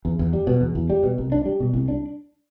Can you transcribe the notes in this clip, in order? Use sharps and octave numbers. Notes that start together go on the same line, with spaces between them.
E2
E2
G3
B2
E2
E2
G3
B2
C2
D4
G3
B2
C2
D4